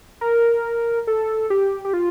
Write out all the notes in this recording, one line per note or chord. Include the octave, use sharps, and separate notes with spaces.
A#4
A4
G4
G4
F4